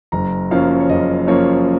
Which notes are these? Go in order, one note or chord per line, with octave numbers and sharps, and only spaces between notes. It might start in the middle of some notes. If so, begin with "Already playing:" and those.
F#1 A#5
F#2 F3 A#3 C#4 F5
C#5
F#1 D#5
F#2 F3 A#3 C#4 C#5